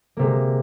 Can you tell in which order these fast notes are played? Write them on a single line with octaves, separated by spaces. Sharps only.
A#3 C3 G#3